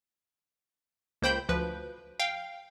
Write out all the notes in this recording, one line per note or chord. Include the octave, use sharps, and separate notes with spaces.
C#2 A#3 C5 G5 B5 G6
D2 F3 B4
F5 G5